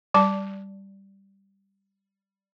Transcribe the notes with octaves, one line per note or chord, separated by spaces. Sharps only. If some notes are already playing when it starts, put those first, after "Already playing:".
G3 D5 A5